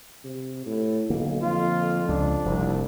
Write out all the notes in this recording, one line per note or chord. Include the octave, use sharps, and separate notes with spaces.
C3
A2
B1 D3 A#3
F2 F4
C#2 D4
F1 C2 C3 F3